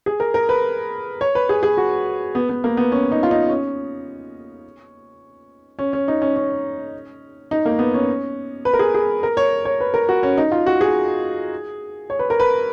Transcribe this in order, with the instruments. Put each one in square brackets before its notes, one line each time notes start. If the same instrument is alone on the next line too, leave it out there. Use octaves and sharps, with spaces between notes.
[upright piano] G#4
A#4
A#4
B4
C#5
B4
G#4
G#4
F#4
B3
B3
A#3
B3
C#4
D#4
F4
D#4
C#4
C#4
C#4
D#4
C#4
C#4
D#4
A#3
B3
C#4
B4
A#4
G#4
G#4
A#4
C#5
C#5
B4
A#4
F#4
C#4
D#4
F4
F#4
G#4
C#5
B4
A#4
B4